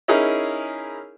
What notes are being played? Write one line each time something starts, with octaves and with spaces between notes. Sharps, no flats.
C#4 D#4 E4 G#4 A#4